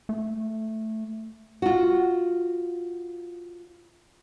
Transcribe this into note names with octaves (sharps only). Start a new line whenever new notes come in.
A3
F4 F#4